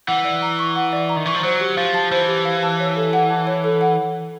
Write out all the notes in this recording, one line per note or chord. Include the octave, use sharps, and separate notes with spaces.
E3 F#5
D5
A#5
C#6
F#5
D5
A#5
D#3
E3 C#6
F3
F#3 C5
G4
F3 F5
A5
E3 C5
G4
F5
A5
C#5
A4
F#5
A5
C#5
A4
F#5